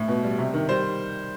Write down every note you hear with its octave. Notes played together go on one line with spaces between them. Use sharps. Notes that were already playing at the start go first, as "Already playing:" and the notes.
Already playing: A2
B2
G3
C3
D#3
G3 C5